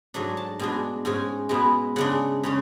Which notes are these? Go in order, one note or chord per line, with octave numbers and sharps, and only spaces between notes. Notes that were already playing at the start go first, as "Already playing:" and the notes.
G#2 F#3 A3 D4 G#5
A5
B2 G#3 D4 G#5
G#2 G#3 C#4 G#5
B2 G#3 B3 E4
C#3 G#3 D4 F#5
C#3 G#3 C#4